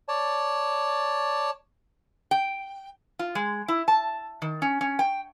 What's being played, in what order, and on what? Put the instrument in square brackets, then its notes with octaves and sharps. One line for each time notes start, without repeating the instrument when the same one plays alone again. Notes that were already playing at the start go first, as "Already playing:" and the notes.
[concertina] C#5 D5 A5
[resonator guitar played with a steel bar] G5
F4
G#3
E4
A5
D#3
C#4
C#4
G5